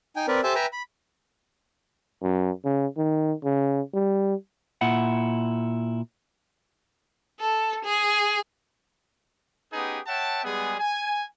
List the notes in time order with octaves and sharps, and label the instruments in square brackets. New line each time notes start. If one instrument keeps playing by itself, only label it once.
[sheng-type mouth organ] D#4 G5 G#5
C4 A#4 B4 D5
G4 A4 C5 E5 G#5 A5
B4 E5 G5 G#5 A#5
B5
[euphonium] F#2
C#3
D#3
C#3
G3
[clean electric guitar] A#2 E4 F#5
[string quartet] A4
G#4
[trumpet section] B3 C#4 D#4 G4 G#4 B4
C#5 E5 F#5 G5 A5
G3 G#3 B3 G#4
G#5